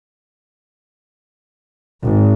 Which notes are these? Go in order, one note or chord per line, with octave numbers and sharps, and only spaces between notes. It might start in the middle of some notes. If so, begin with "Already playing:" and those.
G#1